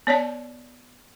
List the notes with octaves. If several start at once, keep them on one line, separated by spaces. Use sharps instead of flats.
B3 C#5 D5 A5